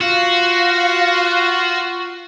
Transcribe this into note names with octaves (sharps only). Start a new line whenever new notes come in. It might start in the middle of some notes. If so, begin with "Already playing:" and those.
F4 F#4 F5